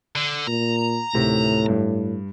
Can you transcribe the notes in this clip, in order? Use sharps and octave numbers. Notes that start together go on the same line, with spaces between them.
D3
A#2 A#5
D2 A2 C3 D#3
G2